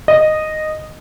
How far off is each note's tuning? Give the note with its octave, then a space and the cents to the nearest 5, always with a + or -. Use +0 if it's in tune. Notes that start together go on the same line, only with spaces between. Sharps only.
D#5 -10